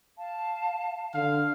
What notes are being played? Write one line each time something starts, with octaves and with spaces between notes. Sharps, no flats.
F5 A5
D3 F5